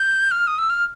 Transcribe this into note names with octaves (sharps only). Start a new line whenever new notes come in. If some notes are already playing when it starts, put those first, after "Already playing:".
Already playing: G6
F6
D#6
E6
F6